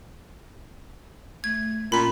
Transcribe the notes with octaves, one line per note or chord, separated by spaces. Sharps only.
A3 G#6
A#2 C#4 B5 B6